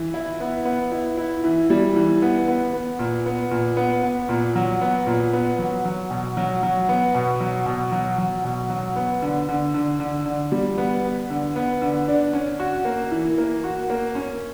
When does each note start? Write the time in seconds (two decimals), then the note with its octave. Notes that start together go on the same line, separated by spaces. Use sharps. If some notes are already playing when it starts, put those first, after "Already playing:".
Already playing: E3
0.14 E4
0.40 B3
0.65 B3
0.92 E4
1.17 E4
1.44 E3
1.70 G3
1.96 E3
2.22 B3
2.48 B3
2.73 B3
2.99 A#2
3.26 B3
3.51 A#2
3.77 B3
4.03 B3
4.29 A#2
4.56 F#3
4.82 B3
5.07 A#2
5.33 B3
5.59 F#3
5.85 F#3
6.11 B2
6.37 F#3
6.63 F#3
6.89 B3
7.15 B2
7.41 F#3
7.66 B2
7.92 F#3
8.18 F#3
8.44 B2
8.70 F#3
8.96 B3
9.22 D3
9.49 D3
9.74 D3
10.00 D3
10.26 D3
10.52 G3
10.78 B3
11.04 B3
11.30 D3
11.56 B3
11.82 D3
12.08 D4
12.33 C#4
12.60 F#4
12.85 A#3
13.11 E3
13.38 A#3
13.64 F#4
13.90 A#3
14.15 C#4